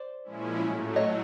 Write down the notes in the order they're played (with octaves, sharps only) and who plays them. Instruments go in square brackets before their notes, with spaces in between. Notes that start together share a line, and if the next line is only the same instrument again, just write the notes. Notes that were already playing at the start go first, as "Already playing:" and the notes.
Already playing: [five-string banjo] C5 D5
[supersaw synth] A#2 F3 G#3 C#4 E4
A2 F#3 A3
[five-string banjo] C#5 D#5